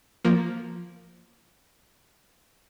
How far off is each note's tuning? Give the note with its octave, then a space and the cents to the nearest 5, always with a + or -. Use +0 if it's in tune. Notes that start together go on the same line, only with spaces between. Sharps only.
F3 +0 A#3 +0